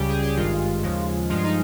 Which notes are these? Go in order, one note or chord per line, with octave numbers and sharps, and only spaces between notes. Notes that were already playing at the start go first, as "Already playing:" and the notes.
Already playing: C#2 C#3 G3 G4
G#4
G4
G#1 G2 D#3 G#3 F4
D#2 C#3 F3 G#3
G2 F3 G#3 F4
D#4